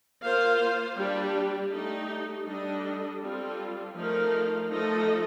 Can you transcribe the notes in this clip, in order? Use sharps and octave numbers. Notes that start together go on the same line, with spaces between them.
A#3 F4 C5 F5
G3 D4 G4
A3 D#4 G4
G3 D4 A4 D#5
G3 C4 F4 A4
F3 A3 D#4 A#4 F5
F3 A3 D#4 A4 D#5